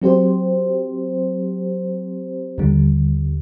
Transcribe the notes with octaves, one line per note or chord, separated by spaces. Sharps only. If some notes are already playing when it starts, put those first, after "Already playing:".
F#3 C4 G4 C5
D#2 D3 G3